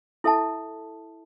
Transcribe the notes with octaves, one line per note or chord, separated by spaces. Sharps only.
E4 A4 E5 A5